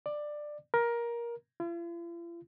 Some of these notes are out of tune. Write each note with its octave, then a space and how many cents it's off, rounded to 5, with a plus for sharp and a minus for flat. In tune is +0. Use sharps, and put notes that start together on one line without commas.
D5 +15
A#4 +15
F4 -45